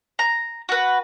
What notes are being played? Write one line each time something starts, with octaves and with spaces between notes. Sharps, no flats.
A#5
F#4 B4